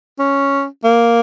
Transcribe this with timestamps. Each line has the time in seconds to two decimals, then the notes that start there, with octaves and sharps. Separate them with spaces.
0.19 C#4
0.84 A#3